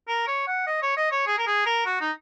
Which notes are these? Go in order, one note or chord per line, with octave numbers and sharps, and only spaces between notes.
A#4
C#5
F#5
D#5
C#5
D#5
C#5
G#4
A#4
G#4
A#4
F#4
D#4